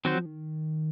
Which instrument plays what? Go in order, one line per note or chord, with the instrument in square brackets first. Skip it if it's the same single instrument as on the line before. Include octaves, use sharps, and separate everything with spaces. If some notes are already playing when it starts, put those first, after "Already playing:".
[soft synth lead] D#3 [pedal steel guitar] F#3 C4 F#4 C5
[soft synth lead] F3
D#3